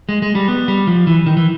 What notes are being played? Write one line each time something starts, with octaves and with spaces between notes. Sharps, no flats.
G#3
G#3
G3
B3
G3
F3
E3
D#3
E3